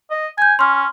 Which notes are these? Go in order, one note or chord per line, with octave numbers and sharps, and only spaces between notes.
D#5
G#5 G6 G#6
C#4 C6 F6